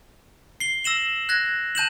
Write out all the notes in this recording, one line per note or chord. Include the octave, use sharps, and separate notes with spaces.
C7 G7
E6 A#6 E7 F#7
F#6 G#6 A#6
A5 G6 E7 F#7